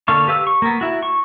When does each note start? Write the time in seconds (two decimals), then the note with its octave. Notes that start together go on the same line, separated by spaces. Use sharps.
0.08 D3 A#3 A4 F5 C#6
0.28 G4 B4 F5 E6
0.47 C#6
0.62 A#3 B3
0.81 E4 F#4
1.03 C#6